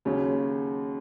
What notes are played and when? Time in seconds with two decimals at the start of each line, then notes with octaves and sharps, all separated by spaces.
0.05 D#2 C#3 F#3 C#4